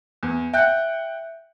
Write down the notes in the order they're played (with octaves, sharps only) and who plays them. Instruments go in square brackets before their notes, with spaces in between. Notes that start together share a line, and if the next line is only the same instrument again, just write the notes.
[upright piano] E2
[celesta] E5 F#6 G6 [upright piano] F#5 G5